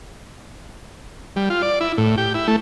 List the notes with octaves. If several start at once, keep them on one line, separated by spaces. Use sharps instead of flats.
G3
F4
D5
E4
A2
G4
E4
A3